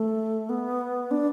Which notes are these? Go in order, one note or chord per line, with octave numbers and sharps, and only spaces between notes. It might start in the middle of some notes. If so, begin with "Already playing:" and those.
Already playing: A3
B3
D4